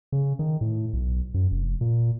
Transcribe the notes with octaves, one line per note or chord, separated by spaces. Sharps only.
C#3
D#3
A2
B1
F#2
F1
A#2